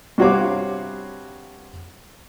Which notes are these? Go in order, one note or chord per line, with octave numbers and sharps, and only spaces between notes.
G2 C3 F#4 C#5 F5 D6